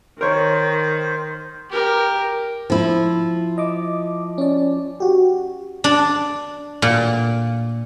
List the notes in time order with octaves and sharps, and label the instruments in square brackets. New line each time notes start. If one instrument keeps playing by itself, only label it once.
[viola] D#3 [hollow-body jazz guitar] A#4 C#5 [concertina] C5
[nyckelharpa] G4 A#4
[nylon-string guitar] F3 E4
[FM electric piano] D#5 D6
C#4 D5
F#4 G4
[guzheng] D4
A#2